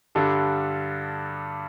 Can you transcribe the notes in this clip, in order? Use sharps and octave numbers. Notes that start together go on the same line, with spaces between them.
G2 D3 G3 D4 A4